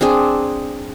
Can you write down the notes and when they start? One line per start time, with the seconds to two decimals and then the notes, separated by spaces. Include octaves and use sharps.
0.01 C4 D4 G#4